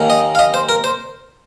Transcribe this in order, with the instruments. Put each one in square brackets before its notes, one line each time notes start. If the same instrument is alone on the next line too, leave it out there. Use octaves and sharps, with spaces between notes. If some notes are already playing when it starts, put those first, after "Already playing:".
Already playing: [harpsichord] D#2 D#3 A#3 C#4
D#5
F5
D#5
C5
A#4
C5